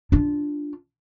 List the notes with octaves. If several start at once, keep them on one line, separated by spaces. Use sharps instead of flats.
D4 F4